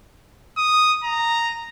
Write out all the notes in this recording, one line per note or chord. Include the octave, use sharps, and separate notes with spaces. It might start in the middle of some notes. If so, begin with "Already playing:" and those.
D#6
A#5